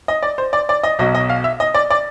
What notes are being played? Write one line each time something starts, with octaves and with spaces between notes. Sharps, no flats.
D#5
D5
C5
D5
D5
D#5
B1 B2 F#3 D#5
D#5
F5
E5
D#5
D5
D5